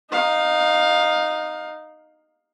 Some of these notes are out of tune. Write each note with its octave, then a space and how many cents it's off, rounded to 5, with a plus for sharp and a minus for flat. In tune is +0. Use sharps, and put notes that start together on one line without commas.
D#4 -10 F5 +15